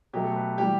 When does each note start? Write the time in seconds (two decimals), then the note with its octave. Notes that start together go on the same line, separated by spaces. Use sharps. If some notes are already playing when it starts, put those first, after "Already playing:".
0.13 B2 F#3 A3 G4
0.24 A4
0.36 B4
0.58 E3 G3 G4